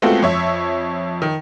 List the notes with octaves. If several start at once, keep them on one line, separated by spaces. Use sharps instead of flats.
G#3 A3 B3 C4 F4 F#4
F2 C#5 E5
D#3